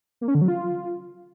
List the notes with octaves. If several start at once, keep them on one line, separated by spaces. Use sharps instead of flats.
A#3
C#4
D3
F#3
F4